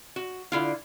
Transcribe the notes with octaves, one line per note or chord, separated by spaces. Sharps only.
F#4
D3 E4 F4